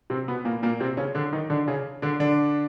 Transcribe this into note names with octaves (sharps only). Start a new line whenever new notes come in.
C3 C4
B2 B3
A#2 A#3
A#2 A#3
C3 C4
C#3 C#4
D3 D4
D#3 D#4
D3 D4
C#3 C#4
D3 D4
D3 D4